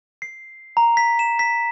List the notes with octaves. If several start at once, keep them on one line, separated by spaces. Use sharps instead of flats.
C7
A#5
B6
E7
B6